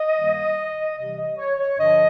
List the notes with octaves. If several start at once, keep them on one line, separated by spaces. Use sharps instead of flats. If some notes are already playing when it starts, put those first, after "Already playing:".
Already playing: D#5
G2 D#3 G3 A#3
C3 E3 G3 D#5
D#5
C#5
C#5
G2 D3 F3 D#5